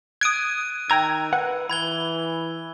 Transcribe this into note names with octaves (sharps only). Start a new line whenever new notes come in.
D#6 F#6 G#6 D7 D#7
D#3 G5 A#5 E6 G#6
B4 F#5
E3 B5 G#6 G7